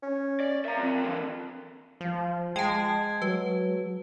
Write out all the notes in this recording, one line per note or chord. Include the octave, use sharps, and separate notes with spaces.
C#4
D5
A#3 E5 A#5
C4 F4
D3 E3
F3
G#3 G5 A5 G#6
F#3 B4